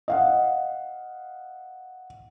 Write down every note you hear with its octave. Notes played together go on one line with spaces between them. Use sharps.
D#5 F5 F#5